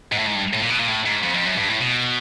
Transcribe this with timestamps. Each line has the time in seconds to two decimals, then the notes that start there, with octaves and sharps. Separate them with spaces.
0.12 G#2
0.19 A2
0.27 G#2
0.36 G2
0.53 A2
0.62 A#2
0.70 B2
0.79 A#2
0.88 A2
1.06 G#2
1.23 F2
1.34 F2
1.45 F#2
1.57 G2
1.69 A2
1.81 B2